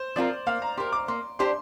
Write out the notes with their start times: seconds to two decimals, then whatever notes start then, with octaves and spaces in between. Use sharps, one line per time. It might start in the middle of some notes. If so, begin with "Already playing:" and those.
Already playing: C5
0.16 F3 C4 F4 A#4 D5
0.46 A#3 F5
0.62 A#5
0.77 G4 A#4 C6
0.92 D6
1.08 A#3 C6
1.39 D4 G4 C5 C6